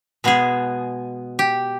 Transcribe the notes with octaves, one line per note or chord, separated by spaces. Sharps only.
B2 G#3 B3 G#4
G4